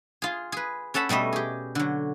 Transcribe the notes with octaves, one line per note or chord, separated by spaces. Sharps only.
F4 G#4
G#4 B4
C#4 A4 F#5 A5 B5
B2 G3 A3 D#5 E5
G4 G#4
D3 F#3